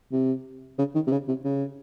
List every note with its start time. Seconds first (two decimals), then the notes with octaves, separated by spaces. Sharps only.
0.12 C3
0.78 C#3
0.95 D#3
1.07 C3
1.12 C#3
1.28 C3
1.45 C#3